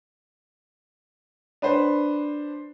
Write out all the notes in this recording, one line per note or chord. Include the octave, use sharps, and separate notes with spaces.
D4 B4 C5